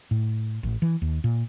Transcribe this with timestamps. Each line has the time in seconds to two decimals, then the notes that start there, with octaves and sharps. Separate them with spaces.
0.11 A2
0.63 A1
0.82 E3
1.02 D#2
1.24 A#2